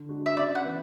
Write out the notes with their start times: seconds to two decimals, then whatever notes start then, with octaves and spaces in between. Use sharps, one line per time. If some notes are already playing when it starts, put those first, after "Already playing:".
Already playing: D3
0.09 G#3 D4 F#4
0.26 E5
0.37 C#3 D5
0.55 F#5
0.64 E3 B3